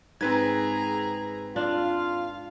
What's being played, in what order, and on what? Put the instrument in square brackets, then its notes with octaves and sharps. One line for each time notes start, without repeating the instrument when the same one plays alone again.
[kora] G#2 [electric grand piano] C4 B4 G#6 [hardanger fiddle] G#4 A#5
[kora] D4 [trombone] F4 [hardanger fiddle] F5